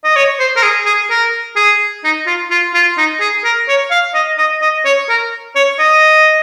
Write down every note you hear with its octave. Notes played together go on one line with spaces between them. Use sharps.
D#5
C#5
C5
A#4
G#4
G#4
A#4
G#4
D#4
F4
F4
F4
D#4
G#4
A#4
C#5
F5
D#5
D#5
D#5
C#5
A#4
C#5
D#5